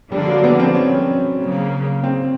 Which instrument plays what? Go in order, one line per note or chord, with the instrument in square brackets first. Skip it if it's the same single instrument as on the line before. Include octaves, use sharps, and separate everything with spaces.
[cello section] D3 F3 A#3 D4 [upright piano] G3
[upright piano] F#3
B3
C4
C#4
[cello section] C#3 F#3 A#3
[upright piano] C4